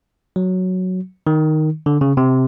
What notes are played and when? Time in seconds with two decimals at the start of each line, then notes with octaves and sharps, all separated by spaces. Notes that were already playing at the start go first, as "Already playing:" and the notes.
0.36 F#3
1.27 D#3
1.86 D3
2.01 C#3
2.17 C3